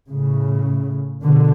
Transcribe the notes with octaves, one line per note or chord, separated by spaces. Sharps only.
A2 C#3
B2 D3